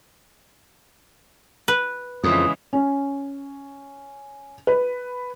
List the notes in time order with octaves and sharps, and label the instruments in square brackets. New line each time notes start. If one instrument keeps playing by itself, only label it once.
[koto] B4
[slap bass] F2 [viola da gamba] C#3 E3 G#3 [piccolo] D#6
[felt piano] C#4
B4